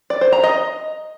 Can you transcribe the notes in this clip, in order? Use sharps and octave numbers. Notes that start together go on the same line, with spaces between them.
D5
C5
A#5
D#5